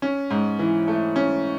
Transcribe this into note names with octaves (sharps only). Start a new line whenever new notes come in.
C#4
G#2
E3
A3
C#4